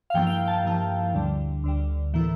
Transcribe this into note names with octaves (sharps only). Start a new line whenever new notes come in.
F5
G2 F3 A#3 E4 G5
F5
G5
A5
G2 F3 A#3 E4
D2 D3 G3
D2 D3 G3
A2 E3 A#3 E4